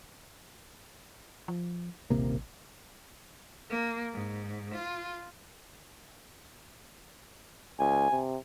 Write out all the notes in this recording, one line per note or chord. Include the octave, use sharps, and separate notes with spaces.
F3
D#1 A1 C3 A#3
A#3
G#2
F4
C#2 G#5
C3